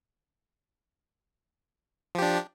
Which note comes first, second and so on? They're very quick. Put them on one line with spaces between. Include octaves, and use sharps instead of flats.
F3 G4 D4